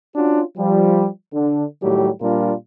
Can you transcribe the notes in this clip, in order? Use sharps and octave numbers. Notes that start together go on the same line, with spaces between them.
C#4 D4 F4 F#4
F3 G3
D3
A2 D#3 F#3 G3 G4
A#2 G3 D4 F4 A#4